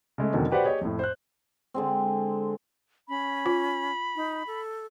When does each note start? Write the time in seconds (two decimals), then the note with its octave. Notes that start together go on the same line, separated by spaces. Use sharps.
0.18 C#3 G#3 A3
0.33 E2 B2 D3 D#3 F#3 C4
0.51 F#4 G4 B4 C5 D5 F#5
0.64 G4 G#4 C#5 D#5 G5
0.81 F2 A2
0.99 C5 F#6
1.74 D3 G#3 C4
3.09 C#4 B5
3.46 F4
4.16 D#4
4.47 A4